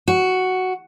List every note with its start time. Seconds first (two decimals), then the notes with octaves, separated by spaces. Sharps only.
0.08 F#4